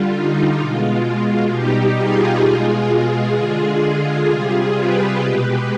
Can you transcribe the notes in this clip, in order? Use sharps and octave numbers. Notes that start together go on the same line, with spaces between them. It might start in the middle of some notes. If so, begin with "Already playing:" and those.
Already playing: D3 G3 F4
D#4
B2 G#3 F4
B2 G3 D#4 G4
F4 G#4
B2 G#3
F4
D3 G#3 F4 G#4
C3 G3
G4 B4
B2 G#3